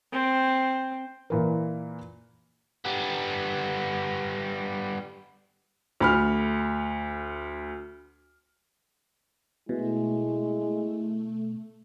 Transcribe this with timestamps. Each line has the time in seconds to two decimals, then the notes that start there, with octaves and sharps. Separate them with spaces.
0.12 C4
1.30 A#2 E3 A#4
2.85 G3 B3
6.00 D2 B5 F6
9.69 B2 G#3 A3 E4